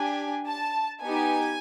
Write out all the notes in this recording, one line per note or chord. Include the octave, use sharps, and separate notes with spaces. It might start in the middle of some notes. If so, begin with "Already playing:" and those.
Already playing: D4 G4 G#5
A5
B3 D#4 G4 G#5